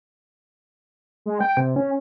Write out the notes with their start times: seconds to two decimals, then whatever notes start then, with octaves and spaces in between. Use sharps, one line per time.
1.26 G#3
1.41 G5
1.57 C3
1.76 C#4